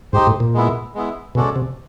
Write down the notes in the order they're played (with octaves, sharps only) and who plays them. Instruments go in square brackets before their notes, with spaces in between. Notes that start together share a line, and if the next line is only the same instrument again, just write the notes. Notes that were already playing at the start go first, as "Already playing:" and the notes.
[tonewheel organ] G#2 [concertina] D#4 G4 C5
[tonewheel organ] A2
A#2
[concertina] G#3 B3 E4
G#3 B3 E4
[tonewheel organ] B2 [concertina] G#3 C#4 F#4 A4 D5
[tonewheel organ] C3